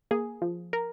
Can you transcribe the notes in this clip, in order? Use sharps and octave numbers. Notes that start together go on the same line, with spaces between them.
A#3 G#4
F3
A#4